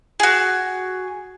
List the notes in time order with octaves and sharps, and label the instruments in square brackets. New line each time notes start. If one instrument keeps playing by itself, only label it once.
[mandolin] F#4 G#4